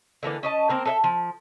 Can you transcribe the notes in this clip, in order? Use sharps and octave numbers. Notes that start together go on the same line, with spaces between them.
D3 E3 A#3 D4
C#4 D#5 A5
A#3 C4 A#4
A4 B4 E5
F3